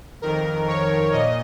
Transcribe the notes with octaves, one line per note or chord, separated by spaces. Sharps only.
F2 D#3 A#4
C#5
A#2 D#5